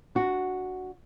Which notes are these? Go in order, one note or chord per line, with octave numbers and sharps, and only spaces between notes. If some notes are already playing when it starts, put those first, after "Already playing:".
D4 F#4